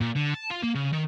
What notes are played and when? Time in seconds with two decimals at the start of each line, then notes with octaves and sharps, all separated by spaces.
0.01 A#2
0.16 D3
0.34 A5
0.50 F4
0.63 A#3
0.75 C#3
0.93 D#3